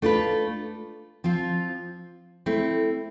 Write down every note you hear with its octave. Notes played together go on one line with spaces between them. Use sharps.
A3 D4 F4 B4
F3 C4 F4
A3 C4 E4